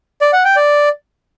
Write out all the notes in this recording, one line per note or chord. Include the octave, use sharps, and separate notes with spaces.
D5
F#5
G5
D5